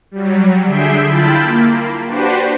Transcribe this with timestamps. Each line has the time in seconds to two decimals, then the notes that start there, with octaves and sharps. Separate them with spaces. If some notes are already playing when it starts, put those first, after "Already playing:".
0.11 F#3 G3
0.66 D3 G#4 E5 G6 C7 D7
1.05 E4 F4 G5 A5 B5
1.40 A#3
2.06 D4 F#4 G4 B4 C5